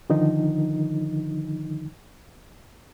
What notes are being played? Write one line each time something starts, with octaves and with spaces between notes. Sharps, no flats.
D3 D#3 F3 D#4